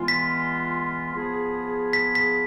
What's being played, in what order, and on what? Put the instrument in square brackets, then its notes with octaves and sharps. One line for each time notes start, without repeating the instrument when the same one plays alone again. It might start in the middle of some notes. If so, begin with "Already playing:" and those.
Already playing: [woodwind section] E3 G#3 B3 F4
[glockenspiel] B6
[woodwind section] F3 B3 F4 G#4
[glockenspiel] B6
B6